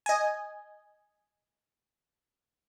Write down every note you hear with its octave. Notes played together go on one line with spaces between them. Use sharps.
D#5 G#5